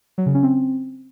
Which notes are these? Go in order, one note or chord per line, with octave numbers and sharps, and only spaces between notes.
F#3
C#3
C#4
C4